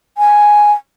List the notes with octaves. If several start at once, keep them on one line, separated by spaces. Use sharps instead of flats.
G#5